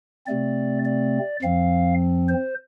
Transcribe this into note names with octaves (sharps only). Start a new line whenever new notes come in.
C3 A3 C4 D5
D5
F2 F3 C4 F5
C5